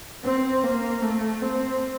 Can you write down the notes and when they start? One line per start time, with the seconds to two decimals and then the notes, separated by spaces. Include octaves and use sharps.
0.24 C4
0.64 A#3
1.03 A3
1.42 C4